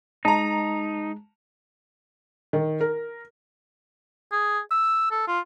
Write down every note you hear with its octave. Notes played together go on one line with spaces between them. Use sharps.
G#3 D#4 A5 A#5
D#3
A#4
G#4
E6
A4
F4